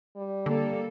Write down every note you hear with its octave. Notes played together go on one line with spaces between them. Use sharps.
G3
D3 A#3 A4